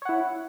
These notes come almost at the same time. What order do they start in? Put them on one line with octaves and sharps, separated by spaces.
C#5 F#5 E4